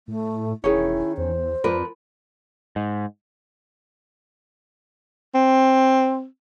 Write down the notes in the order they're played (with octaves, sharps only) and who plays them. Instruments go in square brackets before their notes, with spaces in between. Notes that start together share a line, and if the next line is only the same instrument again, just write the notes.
[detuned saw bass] A2 [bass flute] A3
[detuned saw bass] E1 [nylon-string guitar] D#3 C#4 [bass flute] E4 [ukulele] G#4 C#5
[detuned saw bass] E2 [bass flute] C5
[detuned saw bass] F2 [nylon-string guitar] F3 A#4 B4 [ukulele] F4 D5
[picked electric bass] G#2
[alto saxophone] C4